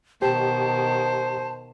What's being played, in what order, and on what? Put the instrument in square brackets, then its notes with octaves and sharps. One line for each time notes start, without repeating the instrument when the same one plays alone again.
[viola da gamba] B2 D#3 [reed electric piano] G4 [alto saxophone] C5 [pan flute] A5